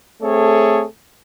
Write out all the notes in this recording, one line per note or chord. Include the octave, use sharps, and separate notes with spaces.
A3 C4 G#4 A4 C#5